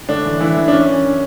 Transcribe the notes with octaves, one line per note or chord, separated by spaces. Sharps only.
A2 D3 D4
E3
E3 E4
E3
D4
F#2 C#4
E3